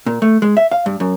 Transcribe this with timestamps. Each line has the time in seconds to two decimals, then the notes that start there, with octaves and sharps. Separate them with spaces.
0.06 A#2
0.22 A3
0.42 G#3
0.57 E5
0.71 F5
0.86 G2
1.00 F#2